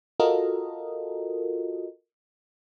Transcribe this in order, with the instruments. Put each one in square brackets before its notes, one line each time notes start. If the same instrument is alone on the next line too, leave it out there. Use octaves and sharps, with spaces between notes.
[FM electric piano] F4 F#4 A4 A#4 D#5